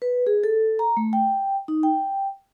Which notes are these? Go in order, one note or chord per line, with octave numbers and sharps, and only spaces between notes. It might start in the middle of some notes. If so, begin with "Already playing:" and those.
B4
G#4
A4
A#5
A3
G5
D#4
G5